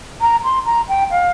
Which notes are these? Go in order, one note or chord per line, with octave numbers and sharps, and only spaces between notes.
A#5
C6
A#5
G5
F5